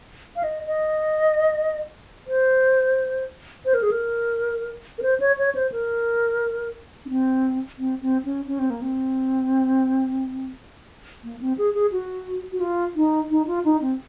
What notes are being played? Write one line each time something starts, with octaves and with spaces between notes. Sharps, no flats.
F5
D#5
D#5
C5
C5
A#4
G#4
A#4
A#4
C5
C#5
C#5
C5
A#4
C#4
C4
C4
C4
C#4
C#4
C4
A#3
C4
A#3
C4
G#4
G#4
F#4
F#4
F4
D#4
D#4
F4
D#4
C4